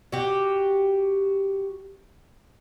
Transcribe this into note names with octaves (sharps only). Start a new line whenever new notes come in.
F#4 G4